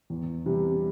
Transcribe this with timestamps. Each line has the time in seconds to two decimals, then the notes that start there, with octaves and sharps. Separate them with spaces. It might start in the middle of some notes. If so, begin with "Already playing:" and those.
0.10 E2
0.46 C3 E3 G3